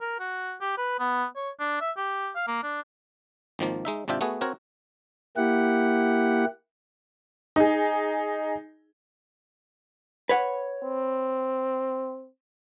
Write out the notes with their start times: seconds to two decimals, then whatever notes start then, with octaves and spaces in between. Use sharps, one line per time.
0.01 A#4
0.19 F#4
0.61 G4
0.78 B4
1.00 B3
1.36 C#5
1.60 D4
1.81 E5
1.97 G4
2.36 F5
2.48 A#3
2.63 D4
3.59 G#1 D#3 F3 A#3
3.85 G#3 D#4 E5
4.08 G#1 C3 D4 F4 E5 G5
4.21 A3 B3 F#4 G#4
4.41 C4 F#4 A#4 C#5
5.37 A#3 E4 G4 F#5
7.56 D#4 G#4
10.29 B4 C#5 F#5
10.84 C4